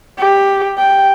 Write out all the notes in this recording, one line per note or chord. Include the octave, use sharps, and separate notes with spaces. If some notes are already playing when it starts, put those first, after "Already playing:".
G4
G5